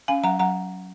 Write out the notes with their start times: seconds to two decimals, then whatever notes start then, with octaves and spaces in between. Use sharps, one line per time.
0.08 C#4 F5 G#5
0.24 F#3 F#5 A#5
0.39 F#3 F#5 A#5